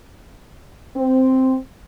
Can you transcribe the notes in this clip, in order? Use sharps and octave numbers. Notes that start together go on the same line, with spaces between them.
C4